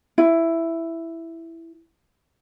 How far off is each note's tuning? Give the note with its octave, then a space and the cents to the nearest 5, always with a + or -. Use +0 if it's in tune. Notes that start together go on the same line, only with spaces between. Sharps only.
E4 +5